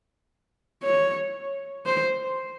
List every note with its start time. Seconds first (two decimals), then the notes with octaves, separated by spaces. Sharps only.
0.83 C#5
1.86 C5